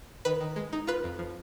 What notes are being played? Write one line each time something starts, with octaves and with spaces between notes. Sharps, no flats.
D#3 B4
D#3
G#3
D#4
F4 B4
F2
F3